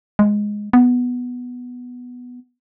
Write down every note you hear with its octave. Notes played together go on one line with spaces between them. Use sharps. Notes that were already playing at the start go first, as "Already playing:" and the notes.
G#3
B3